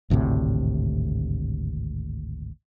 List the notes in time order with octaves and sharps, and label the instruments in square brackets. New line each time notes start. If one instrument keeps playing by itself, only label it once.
[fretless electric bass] G#1 D2 A2 C3